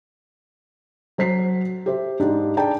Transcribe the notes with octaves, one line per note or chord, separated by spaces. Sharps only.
F#3 C5 B6 C7
G4 C5 E5
G#2 G#3 D4 D#4 G4
G#4 D5 G5 A5 A#5